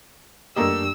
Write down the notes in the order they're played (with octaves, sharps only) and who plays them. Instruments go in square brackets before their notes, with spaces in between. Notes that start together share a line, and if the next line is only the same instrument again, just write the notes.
[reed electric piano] F#2 D4 G4 [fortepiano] A3 A#3 D#5 [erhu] E6